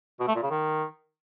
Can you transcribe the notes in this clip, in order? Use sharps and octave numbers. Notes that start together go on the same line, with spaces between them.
B2
A3
A#2
C#3
D#3